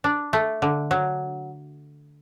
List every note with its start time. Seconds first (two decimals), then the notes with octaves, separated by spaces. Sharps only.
0.04 D4
0.33 A3
0.62 D3
0.91 F#3